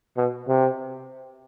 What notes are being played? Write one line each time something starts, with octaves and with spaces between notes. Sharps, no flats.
B2
C3